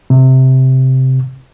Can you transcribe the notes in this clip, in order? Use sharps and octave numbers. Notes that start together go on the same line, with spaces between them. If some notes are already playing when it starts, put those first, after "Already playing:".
C3